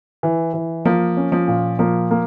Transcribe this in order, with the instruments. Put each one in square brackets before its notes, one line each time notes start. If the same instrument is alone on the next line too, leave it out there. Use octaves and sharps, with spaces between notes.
[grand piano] E3
E3
[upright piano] F3 [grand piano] A#3
[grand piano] C#4
[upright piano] F3
[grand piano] A#2
[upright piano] F3 [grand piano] A#3
[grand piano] A#3